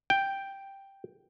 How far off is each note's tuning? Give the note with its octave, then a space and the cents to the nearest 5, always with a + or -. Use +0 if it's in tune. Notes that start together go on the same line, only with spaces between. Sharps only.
G5 +0